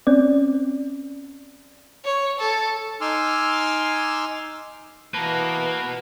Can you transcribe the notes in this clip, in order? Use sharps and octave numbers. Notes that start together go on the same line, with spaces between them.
C4 C#4 D5
C#5
A4
D#4 G#5 C6 D6 E6 F6
E3 A#3 F#4 B4 A5 A#5 A#6